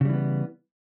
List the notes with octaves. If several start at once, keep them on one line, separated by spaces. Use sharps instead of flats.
C#3 E3 G3 B3